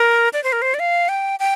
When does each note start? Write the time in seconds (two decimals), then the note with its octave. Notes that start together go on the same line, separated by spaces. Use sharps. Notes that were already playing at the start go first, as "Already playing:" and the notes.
Already playing: A#4
0.33 D5
0.44 C5
0.52 A#4
0.62 C5
0.74 D5
0.79 F5
1.09 G5
1.40 G5